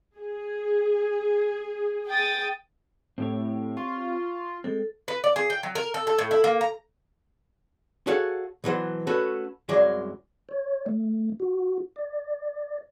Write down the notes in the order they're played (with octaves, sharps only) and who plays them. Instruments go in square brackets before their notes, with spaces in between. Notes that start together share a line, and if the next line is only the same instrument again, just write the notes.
[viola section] G#4
[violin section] G5 D#6 A6
[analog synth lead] A2 [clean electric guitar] C4 G4 C#5
[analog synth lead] F4 [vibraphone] C#6
[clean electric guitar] G#3 C4 [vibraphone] A4
[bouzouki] B4
D5
G#4
G5
F#3
A#4
A4
A4
A2
E4
A#3
A#5
[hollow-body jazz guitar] F#4 G#4 A4 C#5 F5 F#5
B2 E3 F#3 C5
A3 C#4 F#4 A4 B4
C2 F#2 F#3 G#3 G#4 D5
[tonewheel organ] C#5
A3
F#4
D5